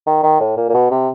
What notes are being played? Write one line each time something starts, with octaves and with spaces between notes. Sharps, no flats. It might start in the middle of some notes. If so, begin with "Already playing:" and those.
D#3
D#3
A2
A#2
A#2
B2
C3